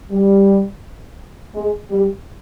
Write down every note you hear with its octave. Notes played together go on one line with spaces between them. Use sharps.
G3
G#3
G3